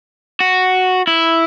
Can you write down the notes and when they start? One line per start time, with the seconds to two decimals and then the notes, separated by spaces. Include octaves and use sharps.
0.40 F#4
1.07 E4